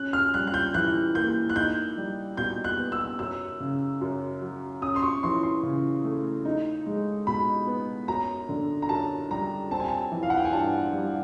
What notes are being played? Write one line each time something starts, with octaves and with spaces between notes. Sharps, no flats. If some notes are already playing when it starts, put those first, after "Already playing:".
Already playing: C#4 F#6
F6
G3 F#6
F#6
G6
E3 F#6
A#3 G6
F#6
D#4 G6
G3
B2 G6
F#6
B3
E6
F#2 E6
C#3
F#2
F#3
C#4 D#6
C6
C#6
E3 C6
C6
C#3
A3
D#4
G#3
B2 B5
B3
F#2 A#5
D3
A#5
F#2 A5
G3 A#5
C4 A5
G#5
A5
E3
F5
F#5
G5
G#5
G2 A5
G3